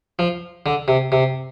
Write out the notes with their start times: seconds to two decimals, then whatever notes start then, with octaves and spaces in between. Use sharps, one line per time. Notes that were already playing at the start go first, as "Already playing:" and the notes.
0.19 F3
0.66 D3
0.88 C3
1.12 C3